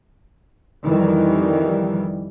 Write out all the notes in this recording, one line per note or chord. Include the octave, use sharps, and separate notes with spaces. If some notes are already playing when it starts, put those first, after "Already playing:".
F2 D#3 E3 G3